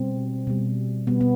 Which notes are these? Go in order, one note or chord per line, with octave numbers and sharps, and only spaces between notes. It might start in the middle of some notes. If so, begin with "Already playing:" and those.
Already playing: B2 G3 C4
B2 G3
B2 G3 B3
B3